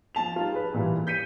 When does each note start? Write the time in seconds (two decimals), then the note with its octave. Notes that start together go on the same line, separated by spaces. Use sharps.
0.15 F3 A5 F7
0.36 G3 D#4 F4
0.52 G#4 B4
0.74 A#2 E3 G3
1.07 G6 B6 C#7 D#7